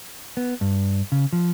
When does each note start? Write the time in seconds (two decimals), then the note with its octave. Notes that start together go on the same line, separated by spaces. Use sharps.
0.37 B3
0.61 G2
1.12 C#3
1.33 F3